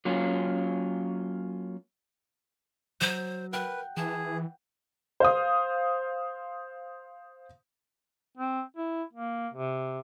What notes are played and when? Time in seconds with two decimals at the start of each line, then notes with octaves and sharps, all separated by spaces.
0.05 F#3 A#3 C#4 F4
3.01 F#3 C5
3.53 A#4 B4 F#5 G5
3.97 E3 G#4 A5
5.20 C5 F5 D#6
8.38 C4
8.77 E4
9.13 A#3
9.54 C3